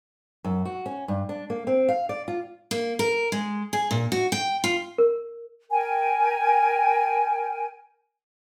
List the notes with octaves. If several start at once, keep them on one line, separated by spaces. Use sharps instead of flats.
F#2
F#4
C#4
G2
D4
A#3
C4
F5
D5
F4
A#3
A#4
G#3
G#4
A#2
F#4
G5
F4
A#4
A#4 G5 G#5